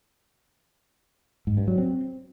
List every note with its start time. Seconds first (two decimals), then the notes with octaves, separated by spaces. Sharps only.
1.47 G#2
1.57 G2
1.68 F#3
1.78 C4